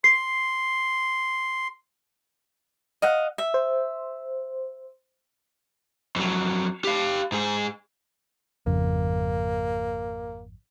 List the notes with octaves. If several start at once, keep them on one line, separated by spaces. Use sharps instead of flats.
C6 C7
D#5 F5 F#5
E5
C5
F2 F#3
G4 F5
G#2 G#4
G#1 F2 C#3 A#3